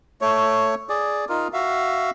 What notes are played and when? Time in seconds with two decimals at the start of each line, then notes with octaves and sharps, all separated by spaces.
0.21 A3 C#5
0.89 G#4 D5
1.29 D#4 F4 A#4
1.53 F#4 E5 F5